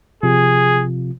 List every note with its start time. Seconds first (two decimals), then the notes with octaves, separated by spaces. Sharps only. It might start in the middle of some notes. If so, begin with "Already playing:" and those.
0.23 C3 F3 F4 G#4